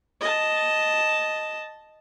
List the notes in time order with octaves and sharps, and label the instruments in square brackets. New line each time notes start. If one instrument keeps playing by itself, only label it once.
[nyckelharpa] D#5 A5